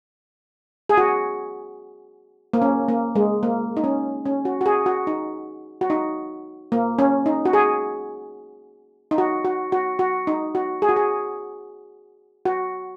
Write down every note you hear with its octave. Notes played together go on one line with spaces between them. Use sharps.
G#4
F#4
A#3
C#4
A#3
G#3
A#3
D#4
C#4
C#4
F#4
F#4
G#4
F#4
D#4
F#4
D#4
A#3
C#4
D#4
F#4
G#4
D#4
F#4
F#4
F#4
F#4
D#4
F#4
G#4
F#4
G#4
F#4